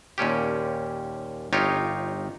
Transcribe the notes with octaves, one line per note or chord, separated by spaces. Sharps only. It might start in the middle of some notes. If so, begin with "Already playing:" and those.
D#2 A#2 C#4 G4
G1 D#4 F4 G4 C#5